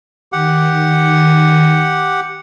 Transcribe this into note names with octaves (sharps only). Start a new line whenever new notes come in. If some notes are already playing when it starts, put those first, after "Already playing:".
D#3 G4 F#5